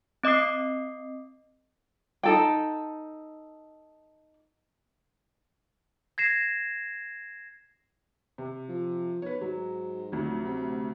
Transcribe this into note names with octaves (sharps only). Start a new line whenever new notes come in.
C4 D#5 D6 D#6 C7
D#4 A4 G5
G#6 A#6 C7 E7
C3
F3
B1 B4 C#5
G#2 F#3
F1 D2 F#3
C3